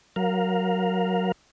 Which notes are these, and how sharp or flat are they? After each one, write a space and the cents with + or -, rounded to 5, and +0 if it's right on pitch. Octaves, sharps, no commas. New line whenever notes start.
F#3 +0 A#4 +0 F5 +15